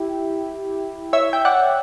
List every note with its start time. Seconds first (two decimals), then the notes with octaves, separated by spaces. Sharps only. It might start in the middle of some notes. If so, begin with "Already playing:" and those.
Already playing: E4 G4
1.13 C#5 E5
1.33 G5
1.45 D5 F#5